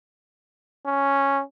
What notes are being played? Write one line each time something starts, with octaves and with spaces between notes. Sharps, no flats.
C#4